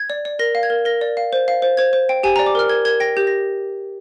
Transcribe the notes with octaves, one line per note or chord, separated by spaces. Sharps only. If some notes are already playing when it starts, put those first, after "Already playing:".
Already playing: G#6
D5
D5
A#4 A#6
F5
G#6
A#4
A#4 A#6
D5
F5
C5
F5
C5
C5 G#6
C5
G5
G4 G#5
D5 A#5
D6
A#4 F6
A#4 G#6
A#4 G#6
G5 A#6
G4 G6
A#6